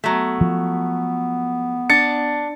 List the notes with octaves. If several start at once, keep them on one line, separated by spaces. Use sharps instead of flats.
F#3 A3 B3
F3
D4 A6 C#7